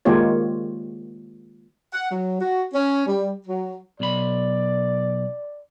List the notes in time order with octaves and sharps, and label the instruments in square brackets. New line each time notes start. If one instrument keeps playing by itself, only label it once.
[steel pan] D#3 G#3 A#3 F4 G4 C#5
[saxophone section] F#5
F#3
F#4
C#4
G3
F#3
[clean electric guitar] B1 B5 [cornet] D5